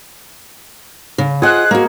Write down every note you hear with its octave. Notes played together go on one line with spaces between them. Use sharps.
C#3
F4 G#4 C5 D#5 F#5 F#6
A#3 F#4 A#4